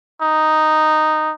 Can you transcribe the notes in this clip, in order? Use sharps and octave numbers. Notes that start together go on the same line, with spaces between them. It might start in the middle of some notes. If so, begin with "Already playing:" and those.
D#4